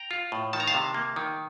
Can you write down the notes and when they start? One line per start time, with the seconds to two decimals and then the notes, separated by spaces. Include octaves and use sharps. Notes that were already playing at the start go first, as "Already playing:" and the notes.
Already playing: G5 A#5
0.11 F4
0.32 A2
0.53 D#3 A5
0.60 A#5
0.67 F5 A5
0.74 C3
0.95 A#3
1.16 D#3